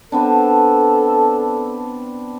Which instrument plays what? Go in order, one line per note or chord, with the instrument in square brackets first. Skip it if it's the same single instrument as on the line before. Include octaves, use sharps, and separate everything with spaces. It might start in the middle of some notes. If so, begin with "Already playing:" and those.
[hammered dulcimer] B3 C4 D4 [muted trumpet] A4